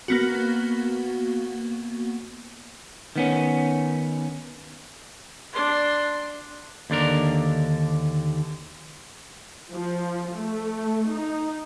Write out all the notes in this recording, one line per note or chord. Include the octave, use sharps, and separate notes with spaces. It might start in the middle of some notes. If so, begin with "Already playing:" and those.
A#3 B3 F#4
D#3 B3 C#4
D4 C6
D#2 D3 D4 A#4
F3
A3
D#4